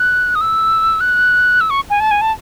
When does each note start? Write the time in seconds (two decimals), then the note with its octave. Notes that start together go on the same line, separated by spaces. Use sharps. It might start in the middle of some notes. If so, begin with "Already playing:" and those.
Already playing: F#6
0.35 D#6
0.41 E6
1.01 F#6
1.61 E6
1.70 C#6
1.90 G#5
2.00 A5
2.11 G#5
2.21 A5